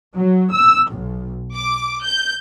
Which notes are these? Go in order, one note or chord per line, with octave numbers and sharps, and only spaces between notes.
F#3
E6
B1
D6
G6